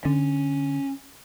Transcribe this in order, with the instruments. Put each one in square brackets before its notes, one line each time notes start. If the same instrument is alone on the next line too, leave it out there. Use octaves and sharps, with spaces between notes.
[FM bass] D3 [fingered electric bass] C#4